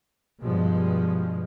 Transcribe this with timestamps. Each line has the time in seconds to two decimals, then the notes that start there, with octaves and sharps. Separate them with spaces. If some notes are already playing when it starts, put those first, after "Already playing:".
0.42 G2 B2 F3 G#3